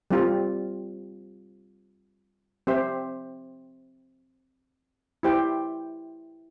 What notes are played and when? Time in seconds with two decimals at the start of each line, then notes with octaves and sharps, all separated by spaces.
0.11 G3 C4 F4
2.67 C4 G4 C5 E5
5.23 E4 G4 C5 G5